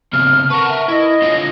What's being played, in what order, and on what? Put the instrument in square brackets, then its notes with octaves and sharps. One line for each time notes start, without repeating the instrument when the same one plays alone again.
[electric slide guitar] C#3 B3 C4 [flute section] F6
[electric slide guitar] A#4 B4 [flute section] F#5 A5 C#6
[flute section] E5
[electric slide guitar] E4 [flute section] D#5
[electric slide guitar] D3 F4 C#5